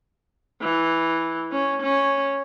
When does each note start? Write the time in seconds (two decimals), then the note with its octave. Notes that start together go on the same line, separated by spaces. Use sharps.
0.62 E3
1.52 C#4
1.82 C#4